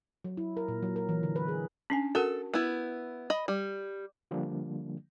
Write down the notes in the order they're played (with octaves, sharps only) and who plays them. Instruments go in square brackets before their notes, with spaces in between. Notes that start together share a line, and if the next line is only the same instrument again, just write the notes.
[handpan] F#3
E4
A#4
A#2
F#3
A#4
E3
D3
B4
G#4
[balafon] C#4 D4 G#5
[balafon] F#4 A#4 F#5 [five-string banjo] A4
[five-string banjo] B3 E4
D#5 B5
G3
[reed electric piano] D3 F3 G3 A#3 D4